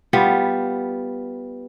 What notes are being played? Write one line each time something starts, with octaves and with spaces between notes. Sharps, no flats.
G3 B3 F4